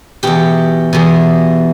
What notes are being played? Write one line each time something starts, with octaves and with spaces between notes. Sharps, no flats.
E2 B2 G4
E2 B2